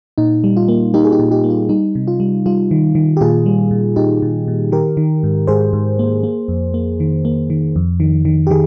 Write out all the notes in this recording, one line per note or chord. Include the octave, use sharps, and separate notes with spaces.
A#2 D#4
G3
F4
A#3
A#3 D#4 G4
G#4
D#4 G4
A#2
D#4 G4
A#3
F4
G3 D#4
C3
F4
G3
G3 F4
D#3
D#3
G4
A#2 F4 G#4
G3
A#2
A#2 D#4 G4
A#2
A#2
D#3 G4 A#4
D#3
G#2
G#2 G#4 C5
G#2
A#3
A#3
F2
A#3
D#3
A#3
D#3
F2
D#3
D#3
G4
D#3 G#4